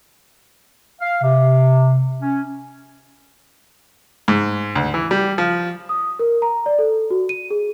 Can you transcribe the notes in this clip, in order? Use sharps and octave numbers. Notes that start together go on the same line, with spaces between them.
F5
C3
C#4
G#2
D2
E3
G3
F3
D#6
A#4
A#5
D5
A4
F#4
D#7
G#4